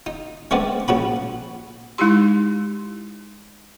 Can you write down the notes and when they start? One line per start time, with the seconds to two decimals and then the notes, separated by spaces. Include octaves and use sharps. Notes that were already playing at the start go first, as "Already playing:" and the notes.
0.06 D#4
0.51 G#3 A3 B3 C4 D4
0.88 A#1 C#4 F#4 B5
1.98 G#3 D#4 E4 G4 C6